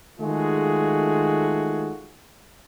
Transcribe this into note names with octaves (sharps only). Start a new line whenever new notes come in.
D#3 G#3 A3 F4 F#4 G#4